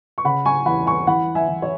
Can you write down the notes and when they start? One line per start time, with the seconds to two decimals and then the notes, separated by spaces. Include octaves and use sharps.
0.18 C#6
0.24 C#3 F#5 B5
0.45 G#5 C#6
0.66 E2 F#5 B5
0.86 G#5 C#6
1.07 E3 F#5 B5
1.35 E5 G#5
1.48 E3
1.62 C#5